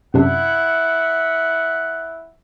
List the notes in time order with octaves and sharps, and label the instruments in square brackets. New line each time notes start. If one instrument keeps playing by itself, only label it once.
[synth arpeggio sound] F#2 C3 D4 [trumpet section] E4 F#5